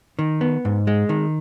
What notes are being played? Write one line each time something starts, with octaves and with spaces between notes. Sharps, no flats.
D#3
B3
G#2
G#3
D#3